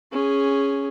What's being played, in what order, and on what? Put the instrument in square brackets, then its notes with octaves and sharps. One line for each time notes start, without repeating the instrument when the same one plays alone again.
[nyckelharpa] C#4 G#4